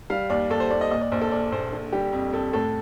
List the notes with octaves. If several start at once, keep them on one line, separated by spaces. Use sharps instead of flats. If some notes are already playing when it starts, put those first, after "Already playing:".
G3 F5
D#2 D5
D#2 A4
C5
D#2 D5
D#5
A#2 D#5
D5
A#1 C5
A4
A#2 D5
A#1 C5
D3
G3 G4
F2
F2 A4
A2 A4